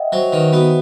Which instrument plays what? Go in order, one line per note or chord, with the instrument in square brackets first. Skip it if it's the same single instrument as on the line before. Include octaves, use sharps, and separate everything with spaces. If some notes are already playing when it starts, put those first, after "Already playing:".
Already playing: [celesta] D#5 E5 F#5 G5
[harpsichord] F#3 [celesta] C5
[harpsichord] D#3 [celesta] B4
[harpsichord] B3 [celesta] F#4